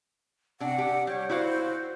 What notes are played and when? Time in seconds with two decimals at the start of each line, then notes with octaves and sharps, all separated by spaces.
0.60 C3 D4 F#5
0.78 G4
1.07 G3 C#5
1.30 E4 F#4 C5 F5